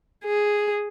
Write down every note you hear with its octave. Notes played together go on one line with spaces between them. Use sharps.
G#4